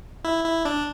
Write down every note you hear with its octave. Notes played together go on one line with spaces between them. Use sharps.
E4
E4
D4